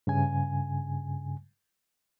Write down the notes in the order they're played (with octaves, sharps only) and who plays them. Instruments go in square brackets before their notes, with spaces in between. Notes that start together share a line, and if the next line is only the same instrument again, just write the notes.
[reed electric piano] G2 C#3 G#5